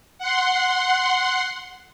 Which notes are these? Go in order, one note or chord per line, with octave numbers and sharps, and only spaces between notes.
F#5 C6